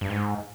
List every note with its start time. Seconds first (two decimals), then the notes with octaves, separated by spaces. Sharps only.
0.01 G2
0.10 G#2